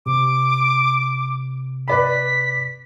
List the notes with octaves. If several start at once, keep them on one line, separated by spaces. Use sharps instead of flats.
C3 D6
B4 D5 B5 B6